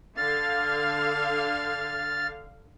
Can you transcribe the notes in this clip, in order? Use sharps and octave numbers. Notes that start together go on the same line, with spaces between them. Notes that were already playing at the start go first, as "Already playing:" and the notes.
D3 F5 F6 A6